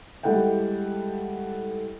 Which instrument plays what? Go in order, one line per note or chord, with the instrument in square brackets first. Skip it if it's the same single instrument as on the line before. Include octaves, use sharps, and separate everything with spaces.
[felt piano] G3 G#3 E4 A4 F#5 G5